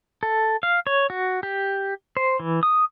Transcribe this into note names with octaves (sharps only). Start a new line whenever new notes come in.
A4
F5
C#5
F#4
G4
C5
E3
D#6